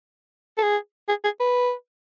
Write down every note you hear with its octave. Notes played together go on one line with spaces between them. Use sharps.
A4
G#4
G#4
G#4
B4